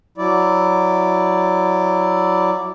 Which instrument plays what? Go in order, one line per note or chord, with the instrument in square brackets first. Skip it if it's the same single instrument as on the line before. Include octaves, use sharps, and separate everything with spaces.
[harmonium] F#3 E4 D5